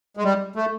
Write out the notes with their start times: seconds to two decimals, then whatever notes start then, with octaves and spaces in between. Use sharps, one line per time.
0.17 G#3
0.24 G3
0.56 A3